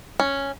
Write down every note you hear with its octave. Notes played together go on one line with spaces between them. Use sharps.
C#4